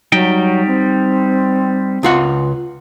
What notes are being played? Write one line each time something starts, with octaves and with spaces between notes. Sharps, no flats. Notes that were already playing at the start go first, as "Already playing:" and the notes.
F#3 G3 D#4 G5
C4
C#2 F4 F#5